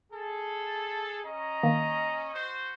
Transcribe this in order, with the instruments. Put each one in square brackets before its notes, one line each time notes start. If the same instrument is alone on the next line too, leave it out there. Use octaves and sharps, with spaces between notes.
[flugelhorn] G#4 [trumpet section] A4
[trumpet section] C#4 [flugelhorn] D#5 [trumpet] A#5
[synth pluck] D#3 A#3
[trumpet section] F#4 C5